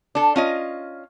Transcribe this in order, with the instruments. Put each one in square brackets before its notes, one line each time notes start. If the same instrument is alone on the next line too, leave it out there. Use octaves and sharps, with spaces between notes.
[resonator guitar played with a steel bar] D4 A4
C#4 F4 D#5